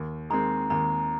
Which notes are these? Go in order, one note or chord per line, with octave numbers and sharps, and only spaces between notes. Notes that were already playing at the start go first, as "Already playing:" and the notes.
Already playing: D#2
D#3 G#3 C4 A#5
D#2 A#5